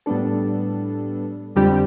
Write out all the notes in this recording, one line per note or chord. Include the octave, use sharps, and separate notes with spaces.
A2 G3 B3 D4 A4
F2 D3 G3 C4 G4